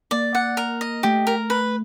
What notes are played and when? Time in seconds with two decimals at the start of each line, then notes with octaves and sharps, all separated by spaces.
0.11 A#3 D5
0.35 F#5
0.57 A#4
0.81 D#5
1.03 A3 G4
1.27 A#4
1.50 B4